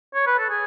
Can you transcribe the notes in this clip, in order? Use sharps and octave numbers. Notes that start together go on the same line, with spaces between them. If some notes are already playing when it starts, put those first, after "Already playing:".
C#5
B4
A4
G#4